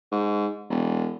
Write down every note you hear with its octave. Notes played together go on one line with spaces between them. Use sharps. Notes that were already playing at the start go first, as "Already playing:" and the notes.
G#2
E1